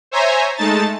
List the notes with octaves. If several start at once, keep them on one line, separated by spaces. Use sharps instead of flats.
C5 C#5 E5 G#5 A#5
G#3 A3 D#4 A5 A6